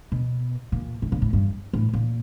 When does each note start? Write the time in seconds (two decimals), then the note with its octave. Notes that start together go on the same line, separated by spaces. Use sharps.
0.12 B2
0.72 A#2
1.02 A2
1.12 A#2
1.22 A2
1.33 G2
1.73 A2
1.93 A#2